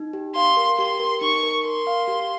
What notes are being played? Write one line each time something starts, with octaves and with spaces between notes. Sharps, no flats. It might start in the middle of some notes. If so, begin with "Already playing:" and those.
Already playing: D#4
G4
F5 C6
A#4
G4 C6
A#4
D#4 C#6
A#4
A#4 C6
F5
G4